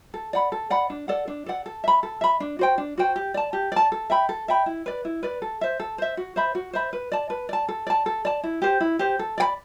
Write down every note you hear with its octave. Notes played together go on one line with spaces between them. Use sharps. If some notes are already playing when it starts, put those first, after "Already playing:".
A4
D5 F#5 B5
A4
D5 F#5 B5
D4
A4 D5 F#5
D4
A4 D5 F#5
A4
E5 B5
A4
E5 B5
D4
F#4 C5 G5
D4
F#4 C5 G5
G4
D5 A5
G4
D5 A5
A4
E5 G5 B5
A4
E5 G5 B5
E4
B4 D5
E4
B4 D5
A4
C5 E5
A4
C5 E5
F#4
C5 E5 B5
F#4
C5 E5 B5
B4
D5 A5
B4
D5 A5
A4
D5 A5
A4
D5 A5
E4
G4 C5
E4
G4 C5
A4
D5 G5 B5